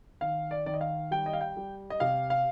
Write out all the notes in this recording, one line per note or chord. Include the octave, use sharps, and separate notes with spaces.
D#3 F5
D5
D#3 D5
D#5
F5
G3 G5
D#5
F5
G5
G3
D#5
C3 F5
F5